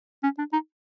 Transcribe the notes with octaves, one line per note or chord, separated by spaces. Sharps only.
C#4
D4
D#4